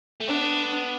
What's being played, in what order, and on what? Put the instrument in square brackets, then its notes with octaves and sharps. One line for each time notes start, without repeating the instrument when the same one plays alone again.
[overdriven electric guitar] A3
[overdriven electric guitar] B3 [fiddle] D4